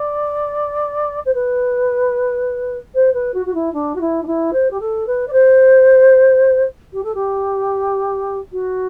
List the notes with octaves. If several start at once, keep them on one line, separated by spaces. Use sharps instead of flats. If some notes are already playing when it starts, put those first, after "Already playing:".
Already playing: D5
C5
B4
C5
B4
F#4
F#4
E4
D4
F#4
E4
D4
E4
C5
G4
A4
B4
D5
C5
G4
A4
G4
F#4